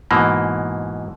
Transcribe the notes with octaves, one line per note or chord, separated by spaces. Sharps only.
G#2 B2 E3 A#3